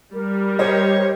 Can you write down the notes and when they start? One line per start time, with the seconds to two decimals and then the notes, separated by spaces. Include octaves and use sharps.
0.14 G3 A#4
0.59 G4 C5 C#5 D#5